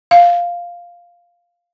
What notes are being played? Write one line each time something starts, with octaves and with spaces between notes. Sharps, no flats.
F5